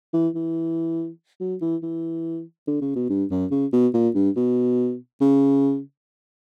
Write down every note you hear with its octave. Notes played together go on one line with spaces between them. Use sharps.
E3
E3
F#3
E3
E3
D3
C#3
B2
G2
F#2
C#3
B2
A#2
G2
B2
C#3